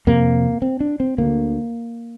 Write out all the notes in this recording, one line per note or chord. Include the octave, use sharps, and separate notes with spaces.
F2 C3 A#3
C4
D4
C4
D2 D3 A#3